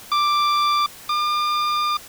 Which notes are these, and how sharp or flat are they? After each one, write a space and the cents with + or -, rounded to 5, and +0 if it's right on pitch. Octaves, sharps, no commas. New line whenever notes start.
D6 +5
D6 +40